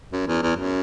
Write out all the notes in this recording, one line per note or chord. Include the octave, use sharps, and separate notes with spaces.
F#2
E2
E2
F#2